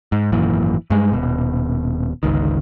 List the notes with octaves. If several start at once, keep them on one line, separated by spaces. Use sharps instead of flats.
G#2
G#1 F#2 A#2 E3
G2 G#3
D#1 B2
G1 C#2 D#3